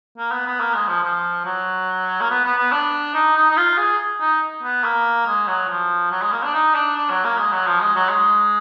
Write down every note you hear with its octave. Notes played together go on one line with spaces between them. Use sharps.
A#3
B3
B3
A#3
G#3
F3
F3
F#3
A#3
B3
B3
B3
D4
D#4
D#4
D#4
F4
G#4
D#4
B3
A#3
G#3
F#3
F3
F#3
G#3
A#3
D4
D#4
D4
D4
F#3
A#3
G#3
F#3
F3
G#3
F#3
G#3